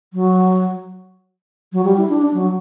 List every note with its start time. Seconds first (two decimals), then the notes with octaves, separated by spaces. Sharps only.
0.14 F#3
1.73 F#3
1.85 G3
1.97 E4
2.09 D4
2.22 D4
2.34 F#3